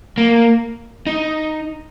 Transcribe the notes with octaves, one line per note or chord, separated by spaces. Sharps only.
A#3
D#4